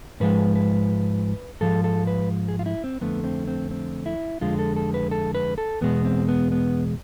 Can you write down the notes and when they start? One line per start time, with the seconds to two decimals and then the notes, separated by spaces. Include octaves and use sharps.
0.20 G#2 F3 G#3 B4
0.56 B4
1.61 G#2 F3 G#3 A4
1.84 A4
2.07 B4
2.48 G#4
2.59 F4
2.66 E4
2.84 C4
3.01 F2 D3 A3 B3
3.24 C4
3.48 C4
3.71 C4
4.06 E4
4.41 F2 D3 G#3 F4
4.59 A4
4.76 A4
4.94 B4
5.11 A4
5.35 B4
5.58 A4
5.81 E2 B2 G#3 B3
6.05 C4
6.28 B3
6.52 B3